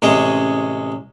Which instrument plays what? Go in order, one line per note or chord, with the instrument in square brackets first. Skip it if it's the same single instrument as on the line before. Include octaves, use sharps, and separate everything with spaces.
[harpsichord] A1 C3 G#3 C#4 G#4 D#5